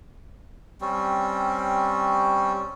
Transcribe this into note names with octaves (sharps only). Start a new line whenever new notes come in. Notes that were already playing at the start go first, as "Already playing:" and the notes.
G3 C4 C#4